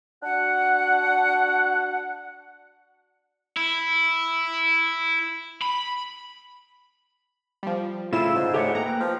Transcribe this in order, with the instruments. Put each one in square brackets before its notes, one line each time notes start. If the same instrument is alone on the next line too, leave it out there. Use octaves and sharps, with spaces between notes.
[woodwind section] D4 F#4 F#5
[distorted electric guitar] E4
B5
[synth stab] F3 G3
[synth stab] A2 F4 E7 [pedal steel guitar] C#3 E6 [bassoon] E4
[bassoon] G#2
[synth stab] A3 [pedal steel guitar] G4 C#5 F#5
[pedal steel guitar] A#3 B4 G5 [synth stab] A#5
[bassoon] F3